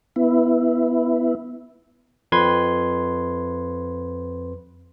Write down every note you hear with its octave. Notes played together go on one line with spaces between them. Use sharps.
B3 E4
F2 B4 C6 G#6